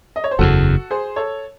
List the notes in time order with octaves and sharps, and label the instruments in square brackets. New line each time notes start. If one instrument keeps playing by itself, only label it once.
[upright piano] D#5
C#5
C5
[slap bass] F#1 E2 C#3 [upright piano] F#4 A4
[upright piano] G#4 C5
A4 C#5